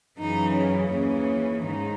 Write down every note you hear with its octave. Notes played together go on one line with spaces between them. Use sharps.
F#2 C#3 E3 D#4
C#4
D#2 C#3 E3 C#4
G#2 D#3 D#4